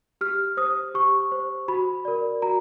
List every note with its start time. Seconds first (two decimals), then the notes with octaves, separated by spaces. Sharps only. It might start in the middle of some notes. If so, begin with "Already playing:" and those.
0.21 G4 F6
0.57 C5 D#6
0.94 G4 C#6
1.32 C5
1.68 F#4 B5
2.05 A#4 D5
2.42 F#4 A#5